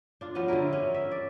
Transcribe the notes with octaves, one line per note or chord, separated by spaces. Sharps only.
D4 F4
F3 B3 C#4 F#4
D3 G#3 E4 A#4
C#4
E5
D5